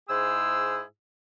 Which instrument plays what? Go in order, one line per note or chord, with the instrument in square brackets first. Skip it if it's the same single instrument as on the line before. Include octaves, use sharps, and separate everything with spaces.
[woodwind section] G#2 E4 G#4 C5 E6